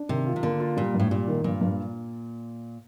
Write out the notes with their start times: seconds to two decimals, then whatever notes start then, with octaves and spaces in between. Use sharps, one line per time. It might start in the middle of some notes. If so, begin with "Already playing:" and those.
Already playing: D4
0.09 C3 D#3
0.26 F4
0.36 C3
0.43 D3 A#3
0.60 F4
0.77 A#2 G3
0.94 G2
1.00 A2
1.11 A#2 G3
1.28 D#3
1.44 G2 A#2
1.61 G2